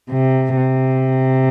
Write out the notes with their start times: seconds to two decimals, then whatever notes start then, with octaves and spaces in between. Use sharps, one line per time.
0.10 C3
0.57 C3